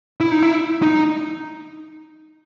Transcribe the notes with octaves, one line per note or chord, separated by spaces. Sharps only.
E4
D#4
E4
D#4